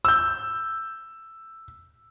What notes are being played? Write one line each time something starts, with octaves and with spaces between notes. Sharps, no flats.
E6 G6